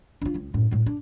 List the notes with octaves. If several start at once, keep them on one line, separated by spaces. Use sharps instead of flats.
D4 F4
C#2 G#3
F#2 A2
A2 G#3
D4